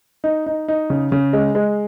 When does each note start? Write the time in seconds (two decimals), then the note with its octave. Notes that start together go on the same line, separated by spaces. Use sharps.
0.24 D#4
0.46 D#4
0.68 D#4
0.90 C#3
1.12 C#3
1.33 G#3
1.55 G#3